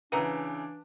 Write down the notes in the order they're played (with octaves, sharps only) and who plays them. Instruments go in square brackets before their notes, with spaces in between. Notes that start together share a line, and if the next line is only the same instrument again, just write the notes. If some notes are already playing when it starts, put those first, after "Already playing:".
[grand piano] C#3 E3 [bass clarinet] D4 [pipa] B4 F#5 A#5